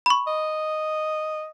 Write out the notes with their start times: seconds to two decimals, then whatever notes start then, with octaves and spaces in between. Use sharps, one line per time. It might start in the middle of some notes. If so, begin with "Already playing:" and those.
0.06 B5 C#6
0.27 D#5